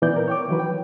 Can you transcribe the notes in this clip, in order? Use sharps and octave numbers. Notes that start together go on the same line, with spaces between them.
A#2 E3 B3 D5 G6
A#4
C#5 G5 D6
D#3 E3 F#3 B4
G5